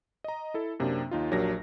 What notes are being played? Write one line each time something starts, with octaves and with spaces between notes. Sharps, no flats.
D#5 A#5
E4 A4
F#2 C3 A#3 C4 D4
D#2 D#4 F4
A#1 F#3 D4 G4 A#4 A#6